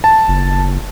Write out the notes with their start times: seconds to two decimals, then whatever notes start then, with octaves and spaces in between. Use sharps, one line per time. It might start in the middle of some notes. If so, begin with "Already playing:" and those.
0.04 A5
0.28 F#1